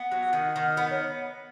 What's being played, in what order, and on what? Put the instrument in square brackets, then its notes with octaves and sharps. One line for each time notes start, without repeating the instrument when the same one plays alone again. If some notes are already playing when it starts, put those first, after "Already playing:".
Already playing: [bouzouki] B3 [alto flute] F#5
[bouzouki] F#3
D#3
D#3
B3
[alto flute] C#5